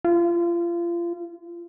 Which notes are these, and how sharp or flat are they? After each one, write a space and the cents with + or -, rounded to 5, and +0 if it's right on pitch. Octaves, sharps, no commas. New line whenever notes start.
F4 -30